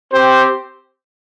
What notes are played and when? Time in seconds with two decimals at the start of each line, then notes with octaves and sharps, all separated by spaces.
0.12 C4 G4 C5